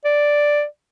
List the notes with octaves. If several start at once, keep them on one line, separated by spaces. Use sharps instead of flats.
D5